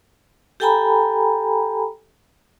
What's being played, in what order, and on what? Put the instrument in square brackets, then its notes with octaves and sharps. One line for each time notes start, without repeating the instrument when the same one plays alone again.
[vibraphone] G4 A4 G5 G#5 A#5 B5